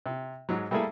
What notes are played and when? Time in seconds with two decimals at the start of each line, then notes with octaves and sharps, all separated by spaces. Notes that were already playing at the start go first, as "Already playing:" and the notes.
0.06 C3
0.49 G#2 F#3
0.71 G3 A3 A#3 E4 G#4 A4